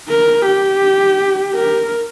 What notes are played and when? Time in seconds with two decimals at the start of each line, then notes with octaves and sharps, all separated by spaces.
0.09 A#4
0.46 G4
1.54 A#4